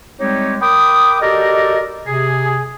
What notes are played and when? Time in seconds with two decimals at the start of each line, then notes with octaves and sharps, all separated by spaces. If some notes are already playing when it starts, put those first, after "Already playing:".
0.20 G3 G#3 C4 D#4 G4 C#5
0.61 A#4 G5 B5 D6 D#6
1.21 F#4 G4 A4 A#4 D5 D#5
2.06 C3 G#4